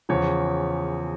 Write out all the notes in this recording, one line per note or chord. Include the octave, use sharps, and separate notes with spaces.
E2 C#3 F3 C#5